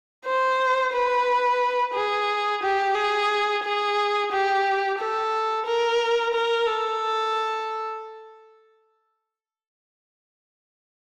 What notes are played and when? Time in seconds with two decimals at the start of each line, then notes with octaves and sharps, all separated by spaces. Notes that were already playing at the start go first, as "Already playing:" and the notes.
0.25 C5
0.93 B4
1.94 G#4
2.62 G4
2.95 G#4
3.63 G#4
4.31 G4
4.98 A4
5.67 A#4
6.33 A#4
6.67 A4